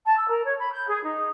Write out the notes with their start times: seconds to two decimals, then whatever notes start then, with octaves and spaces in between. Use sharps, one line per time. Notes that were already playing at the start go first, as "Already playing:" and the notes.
0.06 A5
0.18 E6
0.29 A#4
0.44 C#5
0.59 B5
0.72 G6
0.88 G#4
1.04 D#4